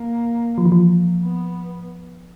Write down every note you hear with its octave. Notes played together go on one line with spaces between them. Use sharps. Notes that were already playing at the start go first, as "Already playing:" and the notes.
Already playing: A#3
F3
E3
F3
B3